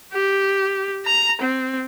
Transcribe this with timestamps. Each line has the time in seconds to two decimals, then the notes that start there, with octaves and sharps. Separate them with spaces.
0.13 G4
1.06 A#5
1.41 C4